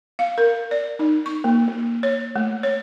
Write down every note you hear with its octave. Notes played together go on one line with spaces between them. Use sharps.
F5
A#4
D5
D#4
C#6
A#3
A#3
C#5
A3
C#5